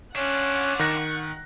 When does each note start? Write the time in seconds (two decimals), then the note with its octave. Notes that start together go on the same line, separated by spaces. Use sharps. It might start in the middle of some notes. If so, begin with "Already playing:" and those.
0.16 C#4 D4 F4 F#5
0.79 D#3 C#6 F#6 A#6